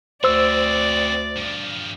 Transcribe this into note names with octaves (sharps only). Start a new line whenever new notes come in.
D2 C4 F#4 C5 D5 E6
G2 F3